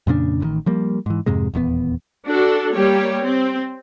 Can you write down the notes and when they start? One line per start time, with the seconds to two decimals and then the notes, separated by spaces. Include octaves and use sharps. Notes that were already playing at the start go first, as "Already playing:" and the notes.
0.07 F2 A#2 C#3 D4
0.40 A1 D3 D#3
0.66 F3 G3 A#3
1.06 G#2 E3
1.26 F2 G#2 C3 G#3
1.54 D#1 E2 F3 B3
2.27 D4 F#4 A4
2.73 G3 A#3 G4 C#5
3.22 C4